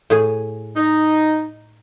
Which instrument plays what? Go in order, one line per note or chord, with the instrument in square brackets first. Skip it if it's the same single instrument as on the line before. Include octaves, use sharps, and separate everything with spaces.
[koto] A2 G#4
[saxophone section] D#4